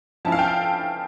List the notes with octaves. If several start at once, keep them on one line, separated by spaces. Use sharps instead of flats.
F3 C#4 E4 A5
F5
G5